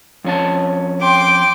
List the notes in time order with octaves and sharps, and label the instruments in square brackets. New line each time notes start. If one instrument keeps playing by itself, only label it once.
[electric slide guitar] F2 C#4 A5
[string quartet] G5 C6 D6